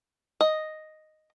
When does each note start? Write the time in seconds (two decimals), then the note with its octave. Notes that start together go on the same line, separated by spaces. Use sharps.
0.41 D#5